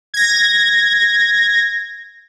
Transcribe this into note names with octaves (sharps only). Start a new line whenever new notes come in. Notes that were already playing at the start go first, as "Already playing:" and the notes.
G#6 A#6